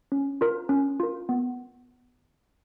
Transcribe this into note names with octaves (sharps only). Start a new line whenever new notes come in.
C#4
F4 A#4
C#4
F4 A#4
B3